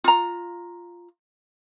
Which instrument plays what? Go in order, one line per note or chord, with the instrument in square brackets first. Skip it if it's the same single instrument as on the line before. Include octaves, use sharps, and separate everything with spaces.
[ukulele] F4 A#5